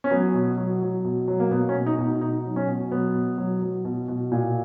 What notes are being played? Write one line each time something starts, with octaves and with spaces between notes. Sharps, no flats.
C#4
F#3 B3
B2
F#3
F#3
B2
F#3
A#3
B2 B3
C#4
B2
D#4
B2
D#4
B2 D#4
F#3
C#4
B2
F#3 B3
B2
F#3
F#3
B2
B2
A#2